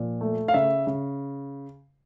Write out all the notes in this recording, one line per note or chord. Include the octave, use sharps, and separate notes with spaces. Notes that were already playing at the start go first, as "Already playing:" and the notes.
Already playing: A#2 F3
A3
F5
C#3 E5
C#3